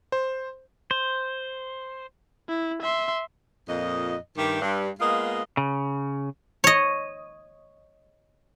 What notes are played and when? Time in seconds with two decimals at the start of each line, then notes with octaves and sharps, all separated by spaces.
0.12 C5
0.91 C5
2.49 E4
2.83 E5 C6
3.68 F2 A#2 D#5
4.37 G2 D#3 A3 G4
4.61 G2
4.99 G#3 A#3 B3 F4 D#5
5.57 C#3
6.64 C#5 D#5